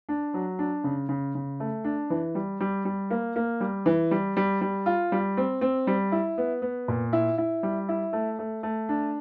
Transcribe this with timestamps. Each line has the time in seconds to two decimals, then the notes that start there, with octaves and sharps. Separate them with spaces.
0.09 D4
0.34 F#3
0.59 D4
0.84 C#3
1.09 C#3
1.35 C#3
1.60 A3
1.84 D4
2.10 E3
2.35 G3
2.60 G3
2.85 G3
3.11 A#3
3.36 A#3
3.61 G3
3.86 E3
4.11 G3
4.37 G3
4.61 G3
4.86 F4
5.12 G3
5.37 C4
5.61 C4
5.87 G3
6.12 E4
6.38 B3
6.62 B3
6.88 A#2
7.13 E4
7.38 E4
7.63 G3
7.89 E4
8.13 A3
8.39 A3
8.63 A3
8.89 D4